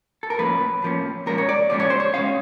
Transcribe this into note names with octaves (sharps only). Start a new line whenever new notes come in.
A4
A#4
A2 F3 A#3 C#4 B4
A2 F3 A#3 C#4
A#2 F3 G#3 C#4 A#4
C#5
D5
A#2 F3 G#3 C#4 D5
C#5
C5
C#5
B2 G#3 C#4 F5